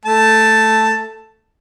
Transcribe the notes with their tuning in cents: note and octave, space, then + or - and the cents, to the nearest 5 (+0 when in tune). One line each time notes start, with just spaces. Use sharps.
A3 +0 A5 +5